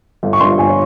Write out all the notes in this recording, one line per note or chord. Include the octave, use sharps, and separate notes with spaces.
G1
C#6
G2 F3 C6
G1 G#5
C#5